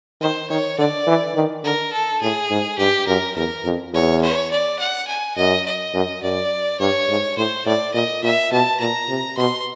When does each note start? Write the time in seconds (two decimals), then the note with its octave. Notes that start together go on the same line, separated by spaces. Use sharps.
0.21 D#3 C5
0.50 D#3 C#5
0.78 D3 D5
1.07 E3
1.36 D#3
1.64 D3 A#4
1.93 A4
2.21 A2 G#4
2.50 G#2
2.78 G2 G4
3.07 F#2 A#4
3.36 E2 A#4
3.65 F2
3.93 E2 C#5
4.21 C#5
4.51 D5
4.79 F#5
5.08 G#5
5.36 F#2 D#5
5.66 D#5
5.94 F#2
6.23 F#2 D5
6.80 G2 C#5
7.09 G#2
7.37 A2 C5
7.66 A2 D5
7.94 A#2 D#5
8.23 A#2 E5
8.52 B2 A5
8.80 A#2 A#5
9.09 C3
9.37 B2 C6